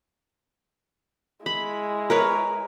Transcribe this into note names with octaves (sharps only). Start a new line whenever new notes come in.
G#3 E4 B5
A#4 B4 C#5